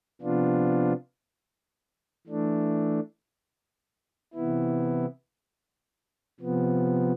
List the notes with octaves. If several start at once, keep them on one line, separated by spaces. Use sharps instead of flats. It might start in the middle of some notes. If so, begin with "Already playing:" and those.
C3 F3 B3 D4 F4
E3 A3 D4
C3 E3 B3 E4
C3 F3 B3